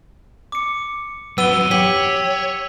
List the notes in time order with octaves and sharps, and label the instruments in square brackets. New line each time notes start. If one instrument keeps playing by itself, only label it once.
[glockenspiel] D6 C#7
[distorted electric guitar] F2 F#3 [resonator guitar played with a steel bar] B3 [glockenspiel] E6 D#7 G7
[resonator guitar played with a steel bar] G4 [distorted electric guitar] C#5 [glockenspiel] B6 F#7